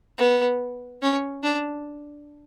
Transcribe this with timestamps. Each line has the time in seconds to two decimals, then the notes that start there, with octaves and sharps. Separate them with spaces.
0.18 B3
1.02 C#4
1.43 D4